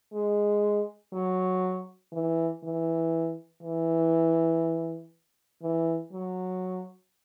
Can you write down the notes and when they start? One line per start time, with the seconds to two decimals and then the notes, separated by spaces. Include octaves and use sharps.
0.13 G#3
1.13 F#3
2.13 E3
2.64 E3
3.63 E3
5.63 E3
6.13 F#3